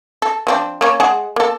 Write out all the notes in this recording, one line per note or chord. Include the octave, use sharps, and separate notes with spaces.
A4
F3 C4 D4
A#3 C#4 C#5
G#3 G#4 F#5
A#3 A4